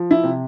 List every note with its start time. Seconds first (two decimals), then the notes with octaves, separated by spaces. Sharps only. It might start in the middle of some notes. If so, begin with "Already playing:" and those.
Already playing: F3
0.11 E4
0.23 C3